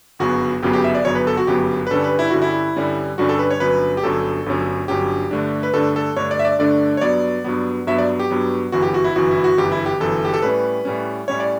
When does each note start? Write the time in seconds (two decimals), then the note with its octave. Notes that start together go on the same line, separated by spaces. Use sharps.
0.19 G1 F#2 C#3 F#3 B3 F#4
0.63 G1 F#2 C#3 F#3 B3 G4
0.73 G4
0.84 E5
0.95 D5
1.05 G1 F#2 C#3 F#3 B3 C#5
1.15 B4
1.27 A4
1.37 F#4
1.47 G1 F#2 C#3 F#3 B3 G4
1.87 B4
1.90 G2 D3 G3 C#4 A4
2.04 B4
2.19 E4
2.30 G2 D3 G3 C#4 F#4
2.42 E4
2.76 G2 D3 G3 C#4
3.18 G2 D3 G3 C#4 F#4
3.29 A4
3.39 B4
3.50 C#5
3.60 G1 G2 F#3 C#4 B4
3.97 G4
4.03 G1 G2 F#3 C#4 A4
4.46 G1 G2 F#3 C#4
4.88 G1 G2 F#3 C#4 G4
5.31 G2 D3 A3 D4
5.63 B4
5.74 G2 D3 A3 D4 A4
5.96 A4
6.16 G2 D3 A3 D4 C#5
6.31 D5
6.39 E5
6.45 D5
6.59 G2 D3 A3 D4 D5
6.97 C#5
7.01 G2 F#3 B3 D5
7.44 G2 F#3 B3
7.87 G2 F#3 B3 E5
7.98 D5
8.19 G4
8.30 G2 F#3 B3
8.72 G1 F#2 E3 F#4
8.82 G4
8.94 F#4
9.04 E4
9.16 G1 F#2 E3 F#4
9.31 E4
9.44 F#4
9.57 G1 F#2 E3 G4
9.72 E4
9.86 G4
10.00 G1 F#2 E3 A4
10.25 G4
10.34 A4
10.42 A2 G3 C#4 B4
10.85 A2 G3 C#4
11.28 A2 G3 C#4 C#5
11.40 D5